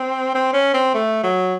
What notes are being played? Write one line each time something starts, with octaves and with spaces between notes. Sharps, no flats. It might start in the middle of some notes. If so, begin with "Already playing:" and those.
Already playing: C4
C4
C#4
C4
A3
F#3